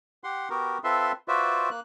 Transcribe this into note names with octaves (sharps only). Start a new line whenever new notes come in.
G4 F#5 C6
B3 F#4 G4 A#4
C4 F4 A4 B4 E5 C6
F4 F#4 B4 C5 D5 E5
A#3 F#6